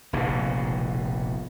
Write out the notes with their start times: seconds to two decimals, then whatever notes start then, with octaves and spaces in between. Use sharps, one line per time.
0.13 F1 A#1 G#2 B2